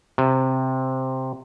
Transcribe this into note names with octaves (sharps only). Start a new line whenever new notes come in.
C3